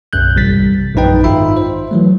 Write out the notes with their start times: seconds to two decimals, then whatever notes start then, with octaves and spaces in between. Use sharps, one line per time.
0.13 B1 F#2 F#6 G6
0.36 A1 C3 G3 A6 B6
0.95 A#1 F#2 A#2 D#4 B4 G5
1.24 G#1 D#4 F4 E5 B5
1.57 C5
1.91 E3 F#3 A3